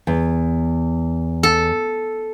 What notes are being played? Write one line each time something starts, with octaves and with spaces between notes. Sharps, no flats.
E2
A4